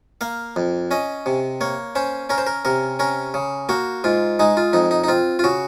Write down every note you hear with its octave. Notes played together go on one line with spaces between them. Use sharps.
A#3 F5
F2
C#4 D#5
C3
A#3 C#5
C#4 C5
C#4 A#4
C5
A#4
C3 A#4
C#4 A#4
C#3
A#3 F#4
G#2 F4
G#3 D#4
F4
F2 D#4
D#4
D#4
C4 F4
F4
C#3 F#4